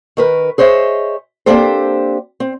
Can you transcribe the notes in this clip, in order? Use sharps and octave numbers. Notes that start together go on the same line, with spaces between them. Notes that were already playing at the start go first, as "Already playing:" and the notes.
D#3 A#4 B4
G#4 C5 C#5 D#5 E5
A#3 C4 D4 G4 A4 C5
C4